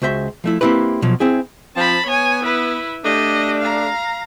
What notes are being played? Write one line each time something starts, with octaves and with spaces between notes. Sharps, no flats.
C#2 F#4 C5 E5 C6
F3 A3 E4
A#3 C4 E4 G4 B4
B2 F3 F#3
C4 E4 G#4
F3 C4 A5 B5
B3 C#5 G#5
E4 B4
A3 D4 G4 D#5
F5 A#5